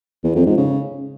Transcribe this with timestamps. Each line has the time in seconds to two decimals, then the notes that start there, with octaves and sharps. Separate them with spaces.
0.24 E2
0.35 F2
0.46 G#2
0.57 C#3